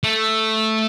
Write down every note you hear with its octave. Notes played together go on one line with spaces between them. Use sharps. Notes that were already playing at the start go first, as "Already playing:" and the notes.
A3